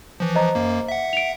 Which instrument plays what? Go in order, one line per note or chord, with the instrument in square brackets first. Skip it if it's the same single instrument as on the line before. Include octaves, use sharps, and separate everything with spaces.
[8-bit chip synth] E3 F3
[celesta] C5 D#5 A#5
[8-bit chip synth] F#2 A#3
E5 F#5
[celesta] D7 F7